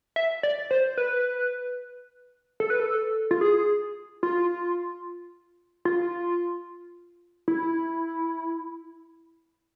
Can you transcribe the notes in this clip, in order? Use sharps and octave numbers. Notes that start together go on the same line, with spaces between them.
E5
D5
C5
B4
A4
B4
A4
F4
G#4
F4
F4
E4